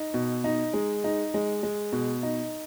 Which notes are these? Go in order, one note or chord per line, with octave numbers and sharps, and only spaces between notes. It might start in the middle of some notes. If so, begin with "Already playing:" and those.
Already playing: D#4
B2
D#4
G#3
D#4
G#3
G#3
B2
D#4